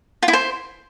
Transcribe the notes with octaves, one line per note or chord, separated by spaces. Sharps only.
F4
E4
C5